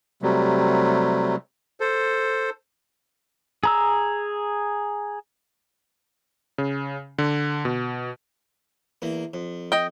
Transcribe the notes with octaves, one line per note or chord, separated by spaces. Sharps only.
C3 F#3 G3 A3
A4 C5
G#4 A#5 E6
C#3
D3
B2
E2 A#3
F2
D#5 G5